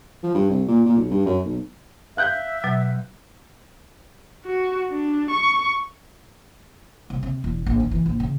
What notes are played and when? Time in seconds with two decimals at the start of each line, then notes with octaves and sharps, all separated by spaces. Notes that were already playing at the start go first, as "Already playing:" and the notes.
0.23 F3
0.35 G2
0.50 C2
0.68 A#2
0.86 A#2
0.97 B1
1.11 G2
1.26 F#2
1.45 B1
2.17 E5 F5 F#6 G6
2.64 B2 F#3
4.45 F#4
4.91 D4
5.31 C#6
7.10 C2
7.23 C3
7.44 E1
7.66 A#1
7.80 D#3
7.91 E3
8.06 A#1
8.20 C#3